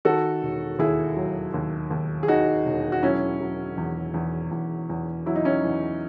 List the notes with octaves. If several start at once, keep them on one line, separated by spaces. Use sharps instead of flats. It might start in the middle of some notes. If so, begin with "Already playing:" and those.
D#3 F#4 A4
E1
D#2 E4 G#4
F#3
D#2
D#2
G#4
D#3 D#4 F#4
E1
F#4
F#3 C#4 E4
F#3
E2
E2
E2
E2
F#3 E4
D#4
C#4 E4
E2